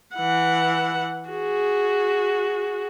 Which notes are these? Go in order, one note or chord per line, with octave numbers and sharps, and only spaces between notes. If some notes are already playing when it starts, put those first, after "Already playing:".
E3 F#5
F#4 G#4